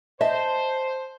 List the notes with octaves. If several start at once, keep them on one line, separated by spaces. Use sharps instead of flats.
C5 D#5 E5 A5